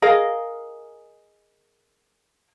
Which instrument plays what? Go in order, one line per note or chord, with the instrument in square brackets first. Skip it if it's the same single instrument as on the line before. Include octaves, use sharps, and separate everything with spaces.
[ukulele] G#4 A#4 D#5 F5